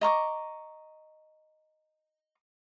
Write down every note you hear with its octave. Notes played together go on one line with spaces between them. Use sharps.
D#5 A#5 C#6 D6